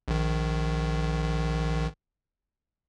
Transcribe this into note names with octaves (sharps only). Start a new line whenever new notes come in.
A#1 D#3